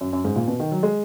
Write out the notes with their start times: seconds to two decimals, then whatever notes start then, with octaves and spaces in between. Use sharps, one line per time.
0.01 F#2
0.13 F#2
0.25 G#2
0.36 A#2
0.48 B2
0.60 D#3
0.71 F#3
0.83 G#3